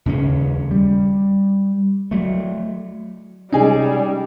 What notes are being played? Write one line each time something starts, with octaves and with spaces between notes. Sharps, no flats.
D#2 C#3 A#3 C#4
G3
F#3 A3
C3 G3 G#3 C#4 D#4 G#4